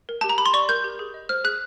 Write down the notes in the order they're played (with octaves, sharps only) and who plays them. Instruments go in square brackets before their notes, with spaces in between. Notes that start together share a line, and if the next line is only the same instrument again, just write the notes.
[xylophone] A#4
G4 A5
A#5
G4 B5
C6
D5 C#6
A#4 G6
G4
G#4
D#5
C5 F6
G#4 F#6